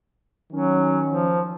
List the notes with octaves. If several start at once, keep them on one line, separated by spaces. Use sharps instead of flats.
D#3 F#3 C#4
F3